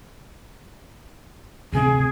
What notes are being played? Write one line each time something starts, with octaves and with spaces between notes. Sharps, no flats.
D2 C3 C4 G#4